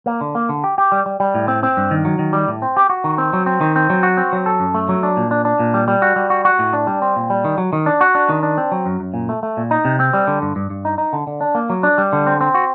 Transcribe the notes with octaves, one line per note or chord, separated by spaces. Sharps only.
A#3
D3
A#3
D3
G4
G4
G3
G3
G3
A2
C4
C4
G2
D#3
F#3
D#3
G3
A2
C4
G4
F#4
D#3
C4
F#3
C4
D#3
C4
F#3
F#4
C4
F#3
A4
F#2
A3
F#3
D4
A#2
D4
D4
A#2
G3
G3
F#4
G3
F#4
F#4
A2
D4
G3
C4
A#2
G3
D#3
F#3
D#3
D4
F#4
D4
D#3
D4
C4
F#3
F#2
F#2
A#2
A3
A3
A#2
D#4
C3
C4
G3
D3
G2
G2
G2
D#4
D#4
D3
D3
D4
A#3
F#3
D4
G3
D3
C4
C4
F#4